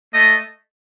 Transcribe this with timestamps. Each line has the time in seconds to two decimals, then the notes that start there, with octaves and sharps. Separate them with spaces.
0.13 A3 D#5